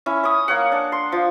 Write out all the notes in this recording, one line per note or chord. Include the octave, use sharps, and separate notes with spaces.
C#4 E4
C#4 D#6
A#3 C#5 F#5
D4
C6
F3